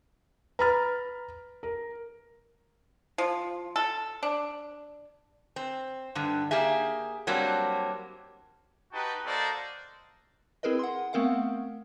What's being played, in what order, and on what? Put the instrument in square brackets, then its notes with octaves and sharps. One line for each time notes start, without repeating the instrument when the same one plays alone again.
[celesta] B4 A6 [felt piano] A#5 B5 F6
[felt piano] A#4
[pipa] F3
A4
D4
[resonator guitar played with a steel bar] C4
G2 D3
A#3 G4 G#4 E5
F#3 G3 A#3 C4 D4
[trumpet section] D#4 F#4 G4 B4 G5 A5
A#3 F#4 A4 C5 D5 D#5
[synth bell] C4 E4 G#4 A#4 B4 D#5
F#5 C6
A3 B3 C4 A#4 F5 F#5